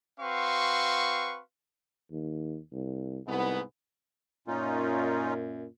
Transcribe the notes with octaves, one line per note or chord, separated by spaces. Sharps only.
C4 F#4 B4 F5 C6 C#6
D#2
C2
C2 G#2 B3
F#2 A#2 C#4 D#4 F4